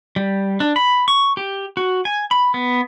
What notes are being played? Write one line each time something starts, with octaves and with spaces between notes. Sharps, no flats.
G3
D4
B5
C#6
G4
F#4
G#5
B5
B3